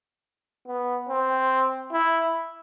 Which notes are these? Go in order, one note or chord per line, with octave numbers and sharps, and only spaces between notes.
B3
C4
E4